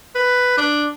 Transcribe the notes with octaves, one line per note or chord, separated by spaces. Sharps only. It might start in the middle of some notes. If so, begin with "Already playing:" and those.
B4
D4